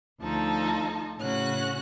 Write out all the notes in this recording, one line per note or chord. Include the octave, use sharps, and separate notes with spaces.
D2 F3 D#4 A4
A2 C#3 C#4 F#4 F#6